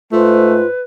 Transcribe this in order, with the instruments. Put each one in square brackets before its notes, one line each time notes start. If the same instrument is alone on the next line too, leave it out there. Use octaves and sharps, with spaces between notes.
[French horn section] G#2 C5 [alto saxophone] A3 [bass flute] F4 [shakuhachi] B4